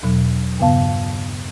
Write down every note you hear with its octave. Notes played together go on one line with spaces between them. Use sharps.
E2 B2 F#3
G2 C#3 B3 F5 A5